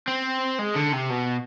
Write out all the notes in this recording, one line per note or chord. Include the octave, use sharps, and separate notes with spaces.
C4
G#3
D3
C3
B2